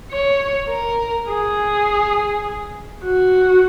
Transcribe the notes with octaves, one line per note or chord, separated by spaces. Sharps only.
C#5
A#4
G#4
F#4